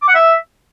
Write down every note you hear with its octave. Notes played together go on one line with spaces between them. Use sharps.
D6
F#5
E5